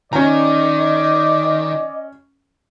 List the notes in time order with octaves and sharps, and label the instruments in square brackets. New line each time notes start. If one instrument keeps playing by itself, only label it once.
[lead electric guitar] D#3 [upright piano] C#4 A#5 [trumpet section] D5 [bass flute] D#5